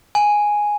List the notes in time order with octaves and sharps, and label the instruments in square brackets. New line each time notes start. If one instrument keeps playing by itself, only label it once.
[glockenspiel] G#5